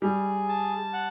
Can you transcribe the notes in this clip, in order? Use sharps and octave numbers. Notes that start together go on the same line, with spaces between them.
G3 G#4
A5
F#5